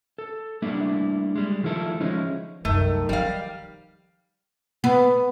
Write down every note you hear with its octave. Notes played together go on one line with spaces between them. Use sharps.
A4
G3 A3 A#3 D4 E4
G3 G#3
D#3 F3 A3 E4 A4
F3 G#3 C#4 D#4 E4
C2 F#2 D#3 A3
F3 G3 F5
B3